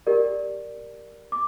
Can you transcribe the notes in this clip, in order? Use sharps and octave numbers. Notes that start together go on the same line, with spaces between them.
G4 A#4 D5
D6